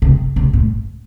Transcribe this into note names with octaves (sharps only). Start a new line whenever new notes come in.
C3
C3
A2